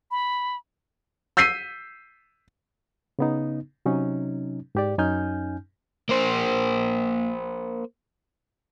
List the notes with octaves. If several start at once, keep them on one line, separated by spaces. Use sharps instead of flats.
B5
E6 G6 B6 C7 D#7
C#3 B3 D#4
C3 F#3 C#4 D#4
G#2 G4 D5
F#2 C#4 D#4 G#5 F6 G6
A#3 C5